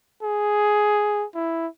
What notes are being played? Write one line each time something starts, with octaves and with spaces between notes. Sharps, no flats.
G#4
E4